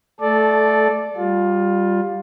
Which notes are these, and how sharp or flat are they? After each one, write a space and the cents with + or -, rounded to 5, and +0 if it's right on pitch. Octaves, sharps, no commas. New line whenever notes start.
A3 +0 A4 -20 D5 +0
G3 +0 F4 +15